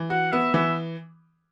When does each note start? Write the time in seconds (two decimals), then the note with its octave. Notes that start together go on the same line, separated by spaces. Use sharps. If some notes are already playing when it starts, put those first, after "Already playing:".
Already playing: E3
0.10 F#4 F#5
0.32 B3 E5
0.54 E3 E5